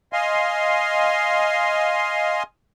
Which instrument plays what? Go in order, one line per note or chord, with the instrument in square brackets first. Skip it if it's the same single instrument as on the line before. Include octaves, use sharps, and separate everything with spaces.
[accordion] D#5 F5 G#5 C6